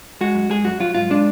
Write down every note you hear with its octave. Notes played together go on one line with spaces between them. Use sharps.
G#3 F#4
F#2
G#3 G#4
F#2 F#4
F#3 F4
G#2 F4
G#3 D4